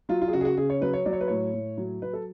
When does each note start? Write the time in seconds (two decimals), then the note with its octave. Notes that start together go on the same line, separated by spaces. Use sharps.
0.09 F#3 F4
0.22 F4
0.28 G#4
0.33 C#3 F#4
0.41 G#4
0.45 F#4
0.57 C#3 G#4
0.70 C#5
0.81 F#3 B4
0.93 C#5
1.05 F#3 D5
1.13 C#5
1.21 B4
1.28 A2 C#5
1.54 A2
1.78 F#3
2.02 F#3 B4
2.13 A4